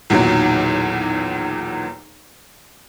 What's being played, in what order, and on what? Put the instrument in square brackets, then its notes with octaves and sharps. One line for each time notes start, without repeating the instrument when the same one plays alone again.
[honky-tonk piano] B1 E2 A#2 D#3 F#3